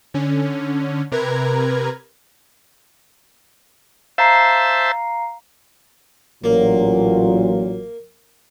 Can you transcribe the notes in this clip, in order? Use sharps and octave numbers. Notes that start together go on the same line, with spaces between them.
D3 C#4
C3 A#4 B4 A#5 G#6
C5 E5 F5 A5 A#5 C7
A1 A#2 F#3 A#3